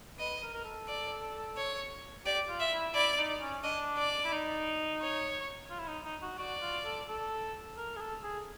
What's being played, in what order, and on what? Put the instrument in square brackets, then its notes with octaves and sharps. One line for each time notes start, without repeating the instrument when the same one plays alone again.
[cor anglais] B4 [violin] D#5
[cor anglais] A#4
A#4
A4
[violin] D5
C#5
[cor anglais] G4 [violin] D5
[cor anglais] F4
[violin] E5
[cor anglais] E4
[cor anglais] E4 [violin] D5
[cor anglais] D#4
C#4
[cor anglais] D4 [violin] D#5
[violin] D5
[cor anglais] E4
D#4
[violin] C#5
[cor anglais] F4
E4
D#4
D#4
F#4
[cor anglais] F#4 [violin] D5
[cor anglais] F4
A4
A4
A#4
G#4
A4
G#4